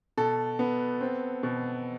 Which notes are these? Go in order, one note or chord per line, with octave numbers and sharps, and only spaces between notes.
B2 A4
B3
C4
B2